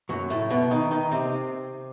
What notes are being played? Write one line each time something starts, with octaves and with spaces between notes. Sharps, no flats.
F#2 F#3
A2 A3
B2 B3
D#3 D#4
D#3 D#4
C3 C4